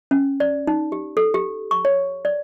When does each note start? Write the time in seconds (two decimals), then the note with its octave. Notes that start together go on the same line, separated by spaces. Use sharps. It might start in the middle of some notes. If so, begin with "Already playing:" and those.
0.11 C#4
0.40 D5
0.67 D#4
0.92 G4
1.17 A4
1.34 G4
1.71 C#6
1.85 C#5
2.25 D5